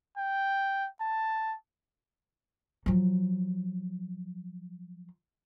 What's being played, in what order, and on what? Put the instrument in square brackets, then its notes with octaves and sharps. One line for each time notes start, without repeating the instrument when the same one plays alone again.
[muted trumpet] G5
A5
[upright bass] F3 F#3